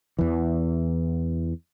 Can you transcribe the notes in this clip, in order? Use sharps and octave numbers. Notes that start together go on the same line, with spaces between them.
E2 E3